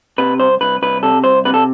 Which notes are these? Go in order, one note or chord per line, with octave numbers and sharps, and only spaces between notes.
C3 B4
C2 C5
C2 B4
C2 B4
C3 A4
C2 C5
C3 B4
A4